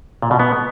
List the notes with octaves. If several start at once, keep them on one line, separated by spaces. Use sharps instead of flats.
A#2
B2
B3